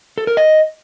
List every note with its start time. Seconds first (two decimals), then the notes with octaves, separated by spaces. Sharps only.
0.18 A4
0.27 A#4
0.37 D#5